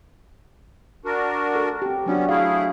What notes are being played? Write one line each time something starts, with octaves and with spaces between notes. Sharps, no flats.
D4 F#4 A#4
A4
C4 G4
F#3 B3 C#4 D4 F#4
A3 E4 G#4 F5